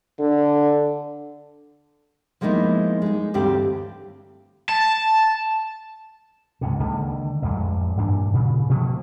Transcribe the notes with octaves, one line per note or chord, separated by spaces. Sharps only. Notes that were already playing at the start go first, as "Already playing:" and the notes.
D3
F3 G#3 A#3 B3 D#4 E4
G#3 D#4
D2 G2 E3 C4 G4 F5
A5
C#2 G#2 C3
C#2 D3 D#3 A#3
A1 F2 G3 G#3
G2 A#2 E3 D4
A#2 C#3
B2 F3 A3 A#3